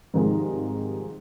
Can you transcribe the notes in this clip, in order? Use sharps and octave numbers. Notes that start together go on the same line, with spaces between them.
G#2 C3 D#3 F3 G3 G#3